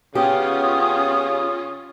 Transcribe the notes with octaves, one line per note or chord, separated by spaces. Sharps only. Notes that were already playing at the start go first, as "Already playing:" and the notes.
C#3 B3 C#4 F4 G4 D#6